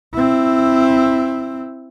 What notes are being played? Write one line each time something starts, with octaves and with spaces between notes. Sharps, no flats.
C4 E4